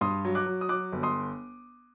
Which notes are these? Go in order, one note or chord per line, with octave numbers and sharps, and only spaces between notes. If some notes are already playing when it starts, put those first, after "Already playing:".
G2 C6 D#6
F#3
D6 F#6
F#3
D#6
F#3 D6 F#6
G1
C6 D#6